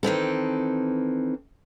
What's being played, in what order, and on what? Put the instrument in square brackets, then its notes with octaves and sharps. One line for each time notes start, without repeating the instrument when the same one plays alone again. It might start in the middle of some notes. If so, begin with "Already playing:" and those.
[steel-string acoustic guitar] D#3 E3 C4 A4